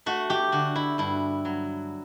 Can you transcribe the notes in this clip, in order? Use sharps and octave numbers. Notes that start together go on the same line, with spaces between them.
A3 F#4
G4
D3 F#4
E4
G2 E4
F#3